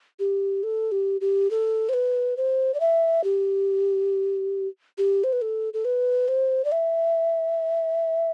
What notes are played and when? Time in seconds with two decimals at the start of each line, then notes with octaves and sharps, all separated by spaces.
0.20 G4
0.63 A4
0.92 G4
1.21 G4
1.51 A4
1.89 C5
1.94 B4
2.37 C5
2.74 D5
2.80 E5
3.24 G4
4.98 G4
5.24 C5
5.33 B4
5.42 A4
5.74 A4
5.85 B4
6.28 C5
6.65 D5
6.72 E5